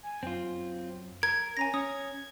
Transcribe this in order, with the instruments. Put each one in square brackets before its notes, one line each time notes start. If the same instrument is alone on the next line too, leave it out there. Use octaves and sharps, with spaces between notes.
[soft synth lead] G#5
[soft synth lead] F#2 [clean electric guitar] C4 F4
[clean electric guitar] A#4 [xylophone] G#6
[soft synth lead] C#4 [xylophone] G#5 A#5 A#6
[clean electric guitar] C#4 [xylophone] D#6 [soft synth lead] G#6